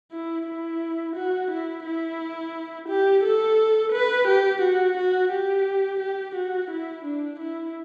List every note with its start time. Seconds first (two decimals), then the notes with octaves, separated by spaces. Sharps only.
0.12 E4
0.47 E4
1.16 F#4
1.51 E4
1.86 E4
2.89 G4
3.24 A4
3.93 B4
4.28 G4
4.62 F#4
4.97 F#4
5.32 G4
6.00 G4
6.36 F#4
6.71 E4
7.05 D4
7.40 E4